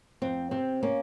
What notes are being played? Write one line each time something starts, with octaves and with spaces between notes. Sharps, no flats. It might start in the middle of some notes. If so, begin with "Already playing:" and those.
F2 C4
C3 C4
A#3 C#4